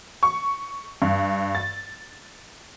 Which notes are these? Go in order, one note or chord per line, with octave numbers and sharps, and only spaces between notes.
C#6
G2
A6